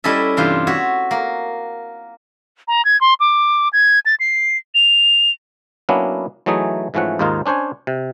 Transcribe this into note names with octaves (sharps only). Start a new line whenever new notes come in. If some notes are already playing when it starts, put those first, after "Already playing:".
G3 C#4 E4 A4 D#5 E5
G2 C3 E3 F4 C5
F#4 C#5 E5
A#3
A#5
G#6
C6
D6
G#6
A6
C7
F7
F#3 A#3 B3 C#4 D4 E4
E3 F#3 A3 D#4 G#4
G#2 E3 F3 A3 C#4 F#5
D#2 G#2 A#3 D#4 F4 A#4
C#4 D4 C5 C#5 G#5
C3